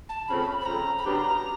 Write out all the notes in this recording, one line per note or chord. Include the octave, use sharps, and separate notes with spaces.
A5
C#3 F3 A3 C4 B5
B5
C#3 F3 A3 C4 A#5
B5
C#3 F#3 B3 D4 G4 A#5